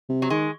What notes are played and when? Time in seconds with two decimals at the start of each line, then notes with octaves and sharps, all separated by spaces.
0.09 C3
0.22 F#3
0.30 D#3 G#3